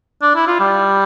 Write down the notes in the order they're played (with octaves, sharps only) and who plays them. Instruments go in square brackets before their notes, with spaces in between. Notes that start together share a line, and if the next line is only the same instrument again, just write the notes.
[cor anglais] D4
E4
F4
G3